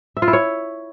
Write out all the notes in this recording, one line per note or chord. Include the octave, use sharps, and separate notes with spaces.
E5
F4
E4
C#5